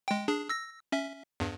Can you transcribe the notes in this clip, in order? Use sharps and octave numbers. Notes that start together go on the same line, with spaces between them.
G#3 G5
D4 G#4
E6 A#6
C#4 E5
E2 G2